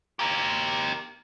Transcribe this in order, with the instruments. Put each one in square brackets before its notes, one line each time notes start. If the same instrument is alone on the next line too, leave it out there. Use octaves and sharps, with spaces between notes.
[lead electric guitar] G4 A#4